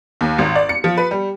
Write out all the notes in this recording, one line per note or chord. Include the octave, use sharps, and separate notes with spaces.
D#2
G#1
D5
C#7
F3
B4
G3